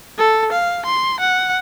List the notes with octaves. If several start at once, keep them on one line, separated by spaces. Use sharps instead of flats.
A4
F5
C6
F#5